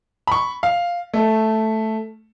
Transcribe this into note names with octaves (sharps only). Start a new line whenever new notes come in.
B5 C#6
F5
A3